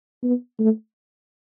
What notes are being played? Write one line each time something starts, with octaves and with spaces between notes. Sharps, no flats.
B3
A3